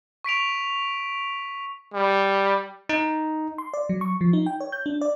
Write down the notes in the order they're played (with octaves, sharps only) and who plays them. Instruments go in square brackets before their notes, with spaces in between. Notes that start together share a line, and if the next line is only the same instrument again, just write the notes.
[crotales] C#6 B6 D7 F7
[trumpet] G3
[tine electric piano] D#4
[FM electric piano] C6
D5
F#3
C#6
F3
D#4
G5
C#5
G6
D4
D5